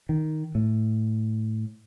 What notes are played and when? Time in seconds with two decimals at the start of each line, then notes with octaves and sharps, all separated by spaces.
0.09 D#3
0.55 A2